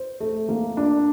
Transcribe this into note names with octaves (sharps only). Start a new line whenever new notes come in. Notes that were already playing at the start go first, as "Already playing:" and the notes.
Already playing: C5
A3
A#3
D4